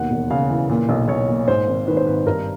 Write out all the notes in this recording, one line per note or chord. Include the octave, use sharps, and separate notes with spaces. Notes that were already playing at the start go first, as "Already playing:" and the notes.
Already playing: D#2 B2 F#5
E1
C#3 F5
E3
A#2
B1
B1 C#5
A#2
G#2 C5
G#1
D#3 B4
C5
G#1 B4
G2 A#4